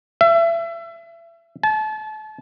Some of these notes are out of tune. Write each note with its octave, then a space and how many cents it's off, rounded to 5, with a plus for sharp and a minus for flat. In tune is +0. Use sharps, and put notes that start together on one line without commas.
E5 +30
A5 -30